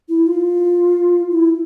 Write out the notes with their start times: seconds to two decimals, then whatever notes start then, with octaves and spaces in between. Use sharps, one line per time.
0.09 E4
0.27 F4
1.31 E4